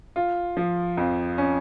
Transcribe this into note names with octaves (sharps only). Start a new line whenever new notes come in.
F4
F3
F2
C#4